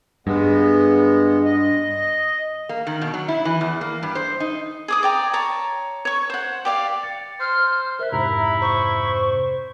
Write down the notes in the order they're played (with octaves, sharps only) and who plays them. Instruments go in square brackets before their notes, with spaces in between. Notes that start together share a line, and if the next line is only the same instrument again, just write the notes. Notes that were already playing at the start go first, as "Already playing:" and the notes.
[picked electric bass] G2 [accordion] G#3 B3
[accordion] D#5
[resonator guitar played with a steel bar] A#3
D#3
B2
F#3
E4
E3
E2
A#3
G2
C5
D#4
[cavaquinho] G#4 D6 D#6
D5 G5 A#5
C#5 A5 A#5
C#5 C#6
C5 F#5
G4 D5 F5
[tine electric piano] A6 C#7
[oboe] C5 [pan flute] F6
[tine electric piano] A#4 C5 F#6 [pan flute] E5
[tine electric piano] F2 G#2 C3 [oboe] E4 [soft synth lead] A#5
[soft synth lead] C5 [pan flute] C#6